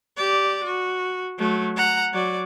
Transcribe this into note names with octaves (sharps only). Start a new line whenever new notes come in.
G4 D5
F#4
F#3 A3
F#5 A#5
F#3 D5